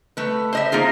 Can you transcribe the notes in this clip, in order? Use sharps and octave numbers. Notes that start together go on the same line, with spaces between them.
A3 B4
C5 D#5 E5
A#3 D#4 F4 G#4